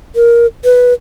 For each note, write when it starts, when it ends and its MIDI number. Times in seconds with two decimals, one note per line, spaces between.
0.16 0.46 70
0.64 0.93 71